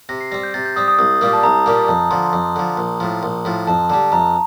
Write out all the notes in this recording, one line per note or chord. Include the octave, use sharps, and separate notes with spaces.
C3 A#6
C7
G3 C4 A#6
G6
C3 A6
G6
G3 C4 D#6
D#6
C2 D#6
A#2 G3 A#3
A5
C2 A#5
A#2 G3 A#3
F2 A5
A#5
D3 F3 C6
D#6
F2 D6
D3 F3
A#1
A2 F3
A#1 C6
A2 F3
F2 A5
D3 G3 A5
F2 A#5